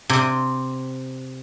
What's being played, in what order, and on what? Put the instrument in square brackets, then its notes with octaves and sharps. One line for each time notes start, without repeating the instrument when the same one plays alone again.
[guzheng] C3